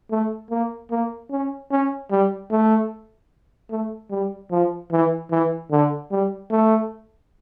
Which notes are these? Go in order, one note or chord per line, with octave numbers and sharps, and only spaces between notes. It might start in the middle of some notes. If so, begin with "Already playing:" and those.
A3
A#3
A#3
C#4
C#4
G3
A3
A3
G3
F3
E3
E3
D3
G3
A3